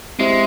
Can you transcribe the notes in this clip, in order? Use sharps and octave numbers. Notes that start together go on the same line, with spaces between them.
G#3 C4 E4 G4 C5 E5